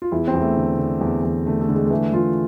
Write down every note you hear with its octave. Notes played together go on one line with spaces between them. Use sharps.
F4
E2 E4
C4
E2
A3
D3
D3
E2
E2
D3 A3
A3
D3
G#3
G#3
E3 A3
E3 F4